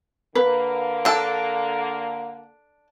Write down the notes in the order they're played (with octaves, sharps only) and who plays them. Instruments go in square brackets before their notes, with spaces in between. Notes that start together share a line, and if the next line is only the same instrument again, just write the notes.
[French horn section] D3 A#3 [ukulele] B4
[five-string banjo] D4 A4